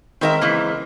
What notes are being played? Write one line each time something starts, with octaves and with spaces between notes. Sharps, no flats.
D#3 G#3 C4 A#4 E5
C#3 E3 A#3